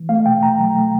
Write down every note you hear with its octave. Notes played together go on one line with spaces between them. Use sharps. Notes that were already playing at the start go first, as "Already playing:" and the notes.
Already playing: E3
A3 F5
B2 G5
C2 A#5
F#3
A3